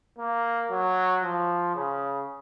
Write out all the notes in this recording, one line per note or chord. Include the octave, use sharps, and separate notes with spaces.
A#3
F#3
F3
C#3